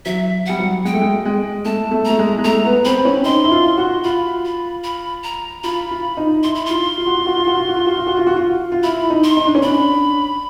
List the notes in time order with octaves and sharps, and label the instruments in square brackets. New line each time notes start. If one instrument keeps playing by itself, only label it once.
[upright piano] F#3 [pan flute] E5
[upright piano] G3 [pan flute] F#5
[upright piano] F#3
[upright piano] G#3 [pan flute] G5
[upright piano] A3
G#3
G#3
[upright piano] A3 [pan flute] A5
[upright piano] A3
[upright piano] A3 [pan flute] A#5
[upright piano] G#3
G#3
[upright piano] A3 [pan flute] A#5
[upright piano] B3
[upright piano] C4 [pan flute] B5
[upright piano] C4
C#4
[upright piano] D#4 [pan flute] C6
[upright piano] E4
F4
F#4
[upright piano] F4 [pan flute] B5
[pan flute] B5
B5
A#5
[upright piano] F4 [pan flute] B5
[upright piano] F4
D#4
[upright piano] E4 [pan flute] C6
[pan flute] B5
[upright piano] F4 [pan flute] C6
[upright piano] F4
F#4
F4
F#4
F4
F#4
F4
F#4
F4
F#4
F4
F#4
F4
F#4
F4
F4
[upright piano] E4 [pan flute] B5
[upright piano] D#4
[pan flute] C6
[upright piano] D#4
D4
C#4
[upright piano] D4 [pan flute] B5